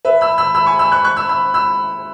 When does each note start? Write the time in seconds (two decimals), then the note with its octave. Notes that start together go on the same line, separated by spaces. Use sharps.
0.05 B4 E5
0.21 B5 E6
0.38 B5 E6
0.55 B5 E6
0.66 G#5 C#6
0.79 B5 E6
0.92 C#6 F#6
1.05 C#6 F#6
1.16 B5 E6
1.29 B5 E6
1.54 B5 E6